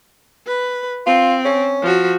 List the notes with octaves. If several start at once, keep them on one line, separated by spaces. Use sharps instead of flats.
B4
C4 F4
C#4
F3 F#4